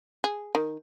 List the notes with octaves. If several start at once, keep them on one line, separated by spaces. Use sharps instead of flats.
G#4
D#3